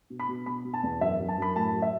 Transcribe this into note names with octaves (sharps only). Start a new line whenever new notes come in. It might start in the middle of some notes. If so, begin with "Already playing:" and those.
B2
B5
B2
B2 B5
B2
A5
E2
F#2 E5
F#2
A5
F#2 B5
A2 A5
F#3
E5